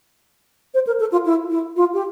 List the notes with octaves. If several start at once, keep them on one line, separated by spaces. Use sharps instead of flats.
C5
A#4
A4
F4
E4
E4
F4
G4